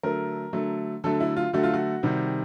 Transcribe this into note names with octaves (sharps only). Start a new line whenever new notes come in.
D3 F#3 A3 A#4
D3 F#3 A3
D3 F#3 A3 A4
E4
F4
D3 F#3 A3 F#4
F4
F#4
C3 D#3 G3